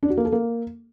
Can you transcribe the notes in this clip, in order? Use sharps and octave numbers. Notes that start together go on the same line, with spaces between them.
D4
F#4
A#3
A4
A#3